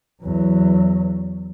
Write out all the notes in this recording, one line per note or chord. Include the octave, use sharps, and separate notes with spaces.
E2 F#3